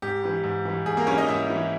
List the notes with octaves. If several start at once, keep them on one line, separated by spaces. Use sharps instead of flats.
G#2 G4
E3 G3
G#2
E3 G3
G#2 G#4
A#3 A#4
E3 G3 C#4 C#5
D#4 D#5
G#2 E4 E5
E3 G3